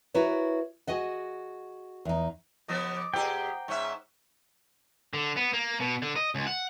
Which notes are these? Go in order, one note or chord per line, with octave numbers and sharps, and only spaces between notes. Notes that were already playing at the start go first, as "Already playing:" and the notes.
E4 F#4 A#4 B4 C#5
F#4 G#4 D#5 F#5
E2 D#4
C#3 F3 B3 D#5 D#6 A#6
D6
A#2 G4 G#4 C5 F#5 G5 A#5
G#2 C#4 E5 C#6 F#6
D3
B3
A#3
B2
D3
D#5
C#2
F#5